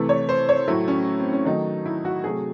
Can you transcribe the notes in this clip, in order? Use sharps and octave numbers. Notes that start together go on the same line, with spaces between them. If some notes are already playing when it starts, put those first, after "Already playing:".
Already playing: C3 E3 A3
C#5
C5
C#5
A2 F#3 A3 E4
C#4
C4
C#4
D#3 F#3 A3 D#4
E4
F#4
C3 F#3 A3 G#4